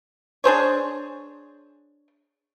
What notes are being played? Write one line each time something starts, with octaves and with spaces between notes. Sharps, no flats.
D4 G#4 C5 C#5